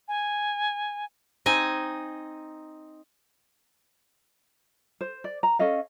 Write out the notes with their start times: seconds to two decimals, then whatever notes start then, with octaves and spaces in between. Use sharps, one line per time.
0.08 G#5
1.46 C4 D#4 G#5
5.01 C5
5.24 D5
5.43 A#5
5.59 C#4 A4 D#5 F5